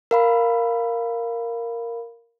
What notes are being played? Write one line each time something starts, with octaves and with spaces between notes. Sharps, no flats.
A#4 F5 B5